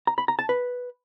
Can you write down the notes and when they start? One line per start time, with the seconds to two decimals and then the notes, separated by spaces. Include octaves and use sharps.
0.07 A#5
0.18 B5
0.28 A#5
0.39 A5
0.49 B4